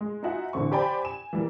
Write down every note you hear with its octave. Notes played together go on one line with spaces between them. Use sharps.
G#3
D#4 F4 F#4 E5 F#5 G#5
A1 D3 E3 C4 C#6
G4 C5 D5 G5 G#5 B5
G#5 E7
E3 G3 A#3